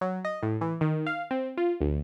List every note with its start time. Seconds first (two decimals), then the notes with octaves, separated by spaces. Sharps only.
0.01 F#3
0.25 D#5
0.42 A2
0.61 E3
0.81 D#3
1.06 F5
1.31 C4
1.57 F4
1.81 D2